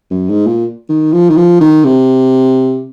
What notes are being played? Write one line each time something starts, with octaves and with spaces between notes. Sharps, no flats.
F#2
G#2
A#2
D#3
F3
D#3
F3
D#3
C3